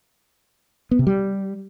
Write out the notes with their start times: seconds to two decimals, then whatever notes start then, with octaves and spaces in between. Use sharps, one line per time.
0.91 B3
0.99 C3
1.07 G3